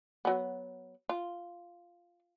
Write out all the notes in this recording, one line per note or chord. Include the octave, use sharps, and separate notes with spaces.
F#3 B3
F4